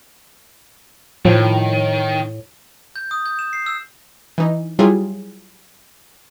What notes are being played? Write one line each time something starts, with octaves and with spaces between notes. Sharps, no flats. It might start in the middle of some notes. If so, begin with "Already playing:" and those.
A2 D#3 F3
G6
D#6
G6
E7
C7
E6
E3 D#4
F#3 G3 E4 F4 G#4